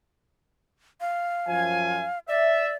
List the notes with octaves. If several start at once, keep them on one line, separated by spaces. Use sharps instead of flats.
F5
F#2 F3 G#5
D5 E5